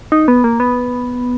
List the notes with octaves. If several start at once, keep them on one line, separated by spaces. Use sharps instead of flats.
D#4
B3
A#3
B3